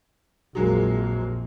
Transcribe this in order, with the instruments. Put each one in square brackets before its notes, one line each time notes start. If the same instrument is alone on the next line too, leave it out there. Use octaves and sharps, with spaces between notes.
[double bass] A#1 F2 [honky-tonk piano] F#3 G#3 A#3